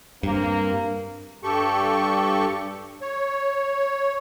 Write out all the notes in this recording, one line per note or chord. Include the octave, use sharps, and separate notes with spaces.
G2 A#3 C4
G2 G4 A4 C#6
C#5